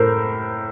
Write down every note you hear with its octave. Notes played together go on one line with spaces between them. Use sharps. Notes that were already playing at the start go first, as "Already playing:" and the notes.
Already playing: A2 A#4 C5